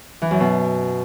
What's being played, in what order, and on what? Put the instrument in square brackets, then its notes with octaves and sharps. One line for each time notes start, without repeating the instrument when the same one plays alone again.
[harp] E3
F#2
B2